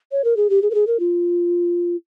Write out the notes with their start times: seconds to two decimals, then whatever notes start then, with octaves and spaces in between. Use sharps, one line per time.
0.12 C#5
0.24 A#4
0.36 G#4
0.50 G4
0.62 G#4
0.70 A#4
0.74 G#4
0.87 A#4
1.00 F4